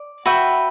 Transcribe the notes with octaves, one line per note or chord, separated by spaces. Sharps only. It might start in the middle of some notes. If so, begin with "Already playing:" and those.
Already playing: D5
F#4 B4 E5 G5